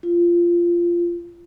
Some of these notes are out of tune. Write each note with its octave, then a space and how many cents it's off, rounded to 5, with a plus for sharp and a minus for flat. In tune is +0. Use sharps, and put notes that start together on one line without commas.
F4 -15